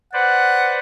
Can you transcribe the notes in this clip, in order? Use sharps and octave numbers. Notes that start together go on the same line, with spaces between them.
B4 C5 D5 F#5